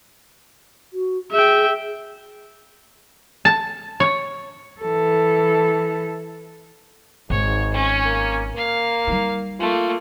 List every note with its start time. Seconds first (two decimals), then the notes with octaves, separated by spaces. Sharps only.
0.93 F#4
1.31 G#4 E5 G5
3.45 A5
4.00 C#5
4.81 E3 A4
7.30 G#1 G#2 C#5
7.73 C#4
8.05 A#3
8.56 A#3 F5
9.07 G3 D#4
9.60 A3 A#3 F4